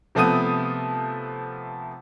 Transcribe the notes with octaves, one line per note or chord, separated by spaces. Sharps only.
C3 F3 A3 B3 D#6 D#7